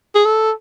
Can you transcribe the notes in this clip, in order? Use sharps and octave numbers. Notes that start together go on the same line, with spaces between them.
G#4
A4